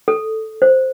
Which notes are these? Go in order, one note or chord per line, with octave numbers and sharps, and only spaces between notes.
A4
C5